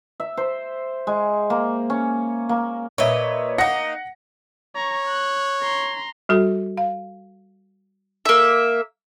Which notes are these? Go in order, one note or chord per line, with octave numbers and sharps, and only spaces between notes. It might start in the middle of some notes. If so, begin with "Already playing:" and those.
E5
C5
G#3
A#3
C#4
A#3
A#2 B4 C#5 D#5 E5
A#3 D#4 F#5 A#6 C#7
C#5 A#5 C#6
F#6
A#5 C6
G3 F#4 A4
F5
A#3 E5